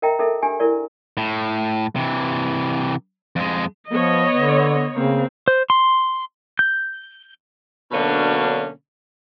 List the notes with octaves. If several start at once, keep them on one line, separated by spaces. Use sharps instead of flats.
A#4 D#5 E5 G5 A#5
D#4 A4 A#4 E5
D4 G4 G#5
E4 A#4 D5
A2
C3 E3
F2 G#3
F3 B3 C#5 D#5
D3
C#3 A#3 C4
C5
C6
G6
B2 D3 F#3 A#3 C#4 D4